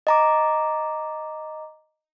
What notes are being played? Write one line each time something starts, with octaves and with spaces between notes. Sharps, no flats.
D#5 A#5 D6